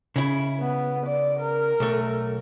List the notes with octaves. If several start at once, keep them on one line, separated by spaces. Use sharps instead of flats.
C#3 E4
B3
D5
A#4
B1 A3